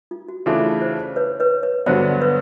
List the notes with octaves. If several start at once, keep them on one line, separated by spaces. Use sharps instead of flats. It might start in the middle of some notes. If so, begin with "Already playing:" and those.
F4
F#4
C#3 E3 A3 D4 F4 G#4
C5
B4 C#5
B4 C#5
B4 C#5
G2 D3 F#3 B3 C5 D5
B4 C#5